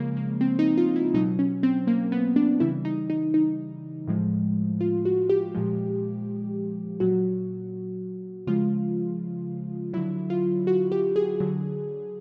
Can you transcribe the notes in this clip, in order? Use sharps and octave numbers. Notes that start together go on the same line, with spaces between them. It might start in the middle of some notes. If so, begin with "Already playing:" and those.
Already playing: C#3 F3 G#3 A#3
A#3
C4
D#4
F4
E4
B2 F#3 D#4
C#4
C4
A#3
B3
D4
C#3 E3 G3 E4
D#4
D#4
D#4
A2 F3 G#3
F4
F#4
G4
A#2 F3 G#3
A#2 F#3 F#4
C#3 F3 G#3 F4
D3 F#3 E4
F4
F#4
G4
G#4
D3 F#3